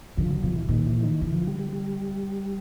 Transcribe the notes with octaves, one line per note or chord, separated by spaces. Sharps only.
D3 F3
F#3
B2 F3
E3
A#2 D#3
E3
D#3
D3 E3
F3
G3
G3
G3